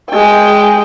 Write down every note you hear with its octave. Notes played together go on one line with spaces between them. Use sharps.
G#3 G5